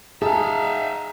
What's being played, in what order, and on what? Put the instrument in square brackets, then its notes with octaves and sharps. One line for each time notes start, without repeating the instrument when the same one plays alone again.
[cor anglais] D#4 [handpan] G#4 [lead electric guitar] E5 F5 [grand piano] A5